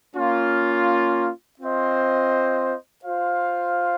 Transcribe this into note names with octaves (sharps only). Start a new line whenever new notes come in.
A#3 C#4 F4
C4 F4 C5 D#5
F4 C5 F5